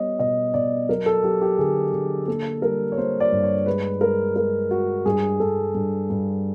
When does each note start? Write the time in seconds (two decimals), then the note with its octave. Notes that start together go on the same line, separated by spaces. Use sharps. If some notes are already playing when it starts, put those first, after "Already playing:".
Already playing: G3 B3 C#5 D#5
0.19 B2 D#5
0.54 B2 D5
0.89 F#3 A#4
1.06 A4
1.24 F#3 G4
1.42 G4
1.58 D3 G#4
1.93 D3
2.28 A#3 A4
2.62 G3 A#4
2.92 C#5
2.98 A#3 C5
3.20 D5
3.32 G2
3.43 C#5
3.66 G#3 B4
4.01 G#3 A#4
4.36 G#3 A#4
4.71 G#3 F#4
5.05 G2 G#4
5.40 G2 A4
5.75 G2
6.10 G2